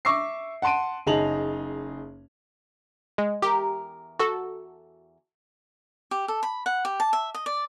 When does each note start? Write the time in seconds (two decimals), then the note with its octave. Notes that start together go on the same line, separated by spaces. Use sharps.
0.05 E5 C#6 D6 E6 A#6 C7
0.62 F#5 A5 C6 D7 D#7
1.07 F#1 D#4 G#4 A5 F7 F#7
3.18 G#3
3.42 E2 G4 A#4 A#5
4.19 F#4 A4
6.11 G4
6.28 A4
6.43 B5
6.66 F#5
6.85 G4
7.00 A5
7.13 E5
7.34 D#5
7.46 D5